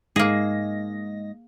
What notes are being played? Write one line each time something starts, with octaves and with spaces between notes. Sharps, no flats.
G#2 A#3 G#4 D#5 A#6